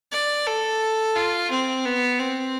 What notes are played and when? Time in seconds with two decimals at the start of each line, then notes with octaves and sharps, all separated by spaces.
0.12 D5
0.47 A4
1.16 F4
1.51 C4
1.85 B3
2.19 C4